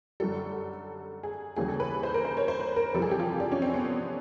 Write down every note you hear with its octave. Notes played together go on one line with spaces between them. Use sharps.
F#2 D3 G3 A4
G#4
D#2 C#3 E3 G3 G#4
A4
B4
C5
A#4
C5
C#5
C5
B4
A#4
F2 C3 E3 G3 A4
G#4
G4
F4
D4
C#4
C4
B3
B3